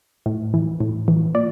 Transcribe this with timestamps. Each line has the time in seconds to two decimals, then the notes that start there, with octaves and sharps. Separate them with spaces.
0.26 A2
0.54 E3
0.81 A2
1.08 E3
1.34 A#2 D5